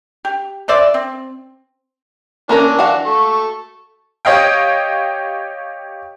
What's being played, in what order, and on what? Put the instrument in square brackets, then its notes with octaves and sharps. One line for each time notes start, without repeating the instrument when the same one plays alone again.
[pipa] G4
E3 C5 D5 E5
C4
[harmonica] E3 D4 [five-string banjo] A#3 C#4 A#4
[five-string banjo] F#4 F5
[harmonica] A4 C#6
[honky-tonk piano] G4 C#5 D#5 F5 G5